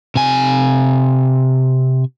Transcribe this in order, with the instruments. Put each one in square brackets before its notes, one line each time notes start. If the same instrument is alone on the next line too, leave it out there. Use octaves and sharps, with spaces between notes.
[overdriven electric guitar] C3 G#5